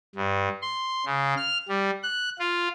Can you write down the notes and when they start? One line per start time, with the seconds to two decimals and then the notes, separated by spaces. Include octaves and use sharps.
0.15 G2
0.62 C6
1.06 C#3
1.37 F6
1.68 G3
2.03 F#6
2.39 F4